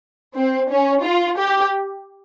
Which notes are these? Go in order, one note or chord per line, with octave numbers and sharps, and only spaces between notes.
C4
C#4
F4
G4